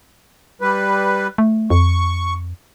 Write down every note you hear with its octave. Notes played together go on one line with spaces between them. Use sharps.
G3 B4
A3
F2 C#6